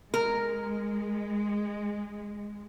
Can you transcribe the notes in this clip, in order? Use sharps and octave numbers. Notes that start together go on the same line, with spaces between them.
G#3 A#4